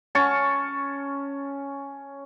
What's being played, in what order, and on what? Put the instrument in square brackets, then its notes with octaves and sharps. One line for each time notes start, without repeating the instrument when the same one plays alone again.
[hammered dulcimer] C#4 A5 C#6